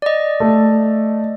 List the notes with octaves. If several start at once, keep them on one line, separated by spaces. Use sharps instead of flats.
D5 D#5
A3